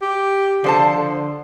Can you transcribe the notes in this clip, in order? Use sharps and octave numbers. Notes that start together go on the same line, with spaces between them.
G4
D3 F3 C5 A5
D3